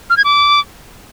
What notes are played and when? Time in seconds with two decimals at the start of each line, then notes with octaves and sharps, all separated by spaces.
0.10 F6
0.17 G#6
0.24 D6